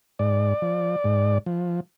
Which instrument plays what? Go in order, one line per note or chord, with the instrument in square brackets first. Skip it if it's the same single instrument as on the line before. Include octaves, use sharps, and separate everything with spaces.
[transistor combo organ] G#2 D5
F3
G#2
F3